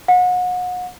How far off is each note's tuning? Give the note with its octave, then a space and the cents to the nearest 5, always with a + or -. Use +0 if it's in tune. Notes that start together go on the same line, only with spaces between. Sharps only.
F#5 -35